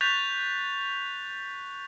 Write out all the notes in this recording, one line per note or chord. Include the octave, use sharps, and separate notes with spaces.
C#6 F#6 G6 A6 B6 F7